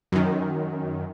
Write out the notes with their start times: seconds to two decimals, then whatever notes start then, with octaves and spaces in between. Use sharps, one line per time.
0.12 F#2 D#3